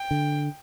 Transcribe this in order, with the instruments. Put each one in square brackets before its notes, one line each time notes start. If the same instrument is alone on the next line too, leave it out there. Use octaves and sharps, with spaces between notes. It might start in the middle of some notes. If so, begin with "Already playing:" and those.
Already playing: [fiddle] G5
[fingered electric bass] D3